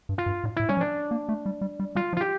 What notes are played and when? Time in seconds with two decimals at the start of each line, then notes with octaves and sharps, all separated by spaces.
0.09 G2
0.18 F4
0.26 G2
0.44 A2
0.57 A2 E4
0.69 G3 C#4
0.77 F3
0.81 D4
1.11 A#3
1.29 A3
1.46 G3
1.61 G3
1.80 G3
1.95 G3 F4
2.13 F3
2.17 F4
2.21 G4